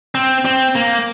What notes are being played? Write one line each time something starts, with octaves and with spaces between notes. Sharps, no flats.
C4
C4
A#3